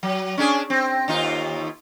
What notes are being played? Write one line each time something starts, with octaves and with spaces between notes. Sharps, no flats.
F#3
C#4 D4 G#4
C4
D#2 D#4 F4